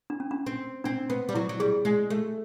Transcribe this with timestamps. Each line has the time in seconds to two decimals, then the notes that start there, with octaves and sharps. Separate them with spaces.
0.10 D4
0.20 C#4
0.31 D4
0.46 C4
0.84 C4 D4
1.10 B3
1.29 G3
1.35 F#3 E4
1.49 F#3
1.60 G3 G#4
1.85 G#3
2.10 A3